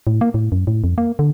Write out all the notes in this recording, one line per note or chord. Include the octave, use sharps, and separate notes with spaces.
A2
A#3
A2
F#2
A2
F2
A#3
D3